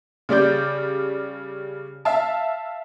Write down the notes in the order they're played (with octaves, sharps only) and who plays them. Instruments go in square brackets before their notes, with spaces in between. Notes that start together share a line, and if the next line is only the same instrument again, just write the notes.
[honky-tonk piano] C#3 G3 D5 G6
E5 F5 A5